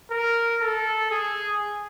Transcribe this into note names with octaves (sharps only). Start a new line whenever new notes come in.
A#4
A4
G#4